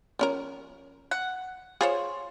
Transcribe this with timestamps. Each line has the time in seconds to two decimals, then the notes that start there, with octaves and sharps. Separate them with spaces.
0.19 F3 C#4 A#4
1.11 F#5
1.81 F4 G#4 C5 C#5